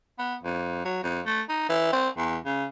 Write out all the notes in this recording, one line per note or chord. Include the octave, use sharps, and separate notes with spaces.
B3
F2
F#3
F2
A3
D#4
E3
C4
E2
C#3